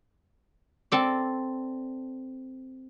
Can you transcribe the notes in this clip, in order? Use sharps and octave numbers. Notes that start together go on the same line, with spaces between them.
C4 A4 D5